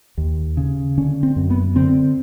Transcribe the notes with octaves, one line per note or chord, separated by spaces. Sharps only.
D#2
C#3
D3 C#4
C4
F#2
B3
D3 C4